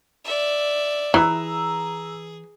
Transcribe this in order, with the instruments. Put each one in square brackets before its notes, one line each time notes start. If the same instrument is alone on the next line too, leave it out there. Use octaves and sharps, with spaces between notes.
[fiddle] D5 E5
[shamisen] E3 [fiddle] G#4 [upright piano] A#5 E6